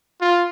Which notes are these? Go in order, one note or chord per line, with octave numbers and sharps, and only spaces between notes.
F4